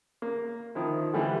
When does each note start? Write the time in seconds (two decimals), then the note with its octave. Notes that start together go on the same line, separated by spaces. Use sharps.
0.22 A#3
0.75 D#3 F3 E4
1.13 D3 E3 G3 A3